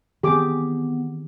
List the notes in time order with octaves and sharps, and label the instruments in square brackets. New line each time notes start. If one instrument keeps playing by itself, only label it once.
[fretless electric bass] D#3 E3 C4 [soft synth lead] B3 [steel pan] G4 G#4 D6